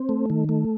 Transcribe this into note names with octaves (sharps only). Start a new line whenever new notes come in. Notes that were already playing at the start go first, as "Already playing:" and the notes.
Already playing: C4
A3
D#3
A3